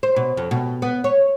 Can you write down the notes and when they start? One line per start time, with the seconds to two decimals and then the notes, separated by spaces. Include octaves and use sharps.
0.03 C5
0.16 B2
0.37 F2
0.51 B2
0.82 B3
1.04 C#5